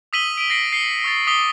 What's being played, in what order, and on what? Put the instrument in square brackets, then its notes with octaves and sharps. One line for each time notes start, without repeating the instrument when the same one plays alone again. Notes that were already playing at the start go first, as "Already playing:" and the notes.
[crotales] D#6 E6 B6 D#7 F#7 G7
D7 D#7
A#6 C7 D7
C7 C#7 G7
C#6 D#6 A6
D6 D#6 B6 G7